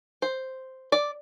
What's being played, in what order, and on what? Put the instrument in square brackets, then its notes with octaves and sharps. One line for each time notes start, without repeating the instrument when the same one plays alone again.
[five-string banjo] C5
D5